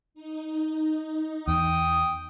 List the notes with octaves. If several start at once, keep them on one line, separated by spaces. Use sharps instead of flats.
D#4
E2 G5 D#6